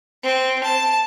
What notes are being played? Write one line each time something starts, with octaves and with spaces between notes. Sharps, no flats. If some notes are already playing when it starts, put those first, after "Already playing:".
C4
A5